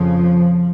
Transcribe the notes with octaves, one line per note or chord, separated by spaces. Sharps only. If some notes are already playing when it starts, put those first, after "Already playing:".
Already playing: F2 C#3 F3